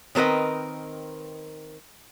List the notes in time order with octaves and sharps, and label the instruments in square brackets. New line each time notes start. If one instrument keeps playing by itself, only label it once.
[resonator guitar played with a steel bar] D#3 C4 A#4 B4 D#5